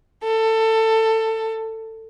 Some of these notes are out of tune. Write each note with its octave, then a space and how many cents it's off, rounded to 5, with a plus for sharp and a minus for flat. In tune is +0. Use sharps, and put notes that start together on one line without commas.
A4 +20